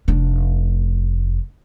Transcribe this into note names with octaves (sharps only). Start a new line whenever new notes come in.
F1 D4